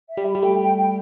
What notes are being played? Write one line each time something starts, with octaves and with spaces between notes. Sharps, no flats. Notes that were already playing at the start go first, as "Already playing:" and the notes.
E5
G3
B5
G3
A3 G5
G5
G5